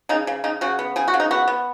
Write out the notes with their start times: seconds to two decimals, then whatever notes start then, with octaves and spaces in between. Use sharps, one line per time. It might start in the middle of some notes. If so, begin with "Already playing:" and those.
0.09 C#3 D#4
0.27 C#3
0.44 C#3 D#4
0.61 C#3 F#4
0.79 B3
0.96 C#3 G#4
1.08 F#4
1.14 C#3
1.20 D#4
1.31 B3 F#4
1.48 B3